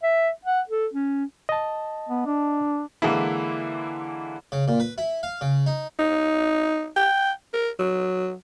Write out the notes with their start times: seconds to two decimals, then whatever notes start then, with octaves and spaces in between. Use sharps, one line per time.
0.03 E5
0.45 F#5
0.69 A4
0.94 C#4
1.49 D#5 A5
2.09 B3
2.26 D4
3.02 D3 E3 G#3 A#3 E4
4.52 C#3
4.68 A#2
4.80 B4
4.98 E4
5.23 F5
5.41 C#3
5.66 D#4
5.99 D#4
6.96 G5
7.53 A#4
7.79 F#3